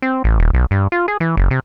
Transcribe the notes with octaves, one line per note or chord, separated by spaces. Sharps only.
C4
A1
D#1
B1
G2
F4
G#4
E3
F#1
C3